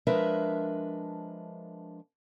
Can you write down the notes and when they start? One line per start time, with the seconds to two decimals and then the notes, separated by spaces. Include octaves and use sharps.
0.07 F3 G#3 D4 A#4 B4 E5